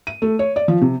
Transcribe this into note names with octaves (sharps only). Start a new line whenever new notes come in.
D#7
A3
C#5
D5
F3
C3